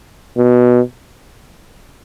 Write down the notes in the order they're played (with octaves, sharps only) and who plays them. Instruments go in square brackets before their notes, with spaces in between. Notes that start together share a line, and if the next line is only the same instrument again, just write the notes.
[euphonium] B2